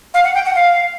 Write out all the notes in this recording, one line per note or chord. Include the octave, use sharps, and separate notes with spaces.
F5
F#5
G5
F#5
F5